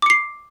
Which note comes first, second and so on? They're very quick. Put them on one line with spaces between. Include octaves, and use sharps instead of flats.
D6 C#7 C7